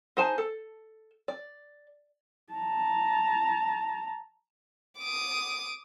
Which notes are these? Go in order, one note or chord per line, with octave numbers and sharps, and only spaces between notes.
D#4 G#4 C5 G#5 A5
A4
D5
A5 A#5
D6 D#6